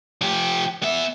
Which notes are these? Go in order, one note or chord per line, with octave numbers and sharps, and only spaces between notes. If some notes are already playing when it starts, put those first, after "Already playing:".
F3 G4
B3 E5